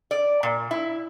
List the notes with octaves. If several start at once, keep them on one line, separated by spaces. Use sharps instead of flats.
D5
A#2
E4